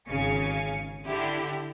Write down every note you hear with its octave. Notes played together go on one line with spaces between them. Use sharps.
G#1 C#3 F5 G#5 C#7
D3 E4 G4